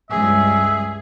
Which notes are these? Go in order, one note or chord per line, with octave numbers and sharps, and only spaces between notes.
C#2 G2 G#4 E5